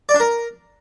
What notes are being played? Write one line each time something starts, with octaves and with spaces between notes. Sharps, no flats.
D5
D4
A#4